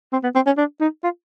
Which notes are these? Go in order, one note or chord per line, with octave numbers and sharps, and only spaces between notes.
C4
B3
C4
C#4
D4
D#4
F4